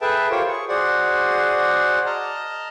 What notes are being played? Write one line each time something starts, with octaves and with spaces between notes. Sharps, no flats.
G#4 A4 B4 E5 G5 A5
F4 G4 A#4 C5 C#5
G#4 C#6
F#4 G#4 C5 D5 F#5
D#5 A5 A#5 F6